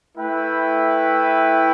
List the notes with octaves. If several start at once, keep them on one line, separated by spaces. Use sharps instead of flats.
A3 E4 B4 E5 G5